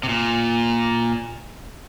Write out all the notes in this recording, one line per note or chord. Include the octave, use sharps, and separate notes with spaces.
C3
A#2